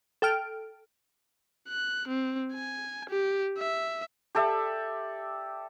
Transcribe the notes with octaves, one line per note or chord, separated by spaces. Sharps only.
A4 G5 F6 D7
F#6
C4
G#5
G4
E5
G4 A4 D5 E5